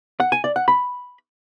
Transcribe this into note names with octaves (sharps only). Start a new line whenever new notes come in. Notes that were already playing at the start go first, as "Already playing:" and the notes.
F#5
G#5
D5
F#5
B5